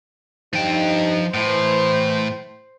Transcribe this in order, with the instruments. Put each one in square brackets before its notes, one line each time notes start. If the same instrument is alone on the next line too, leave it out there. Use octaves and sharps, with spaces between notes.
[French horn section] G2 D#4 [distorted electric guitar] F3 G5
[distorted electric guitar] A2 [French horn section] E3 [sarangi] C5